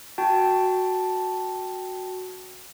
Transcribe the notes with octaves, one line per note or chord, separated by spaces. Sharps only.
F#4 G5 A5